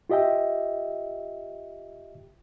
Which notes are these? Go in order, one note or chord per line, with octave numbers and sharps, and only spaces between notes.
F4 G4 D#5 E5 G5